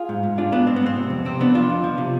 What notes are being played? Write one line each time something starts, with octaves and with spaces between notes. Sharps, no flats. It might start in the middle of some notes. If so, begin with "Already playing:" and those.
Already playing: F4 G#4
G#2
G#2
G#2 D4 F4
G#2 B3 D4
G#2 C4
B3
G#2 C4
C3
F2
C3 C4
F2 B3 D4
F3 D4 F4
F2
F3
C3